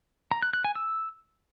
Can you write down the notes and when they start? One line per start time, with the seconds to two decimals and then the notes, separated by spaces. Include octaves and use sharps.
0.31 A#5
0.42 F#6
0.53 F#6
0.64 G#5
0.75 E6